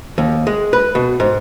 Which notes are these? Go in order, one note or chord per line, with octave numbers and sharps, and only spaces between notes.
D#2
G#3
B4
B2
G#2